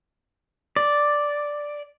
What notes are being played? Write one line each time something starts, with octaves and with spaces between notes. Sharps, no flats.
D5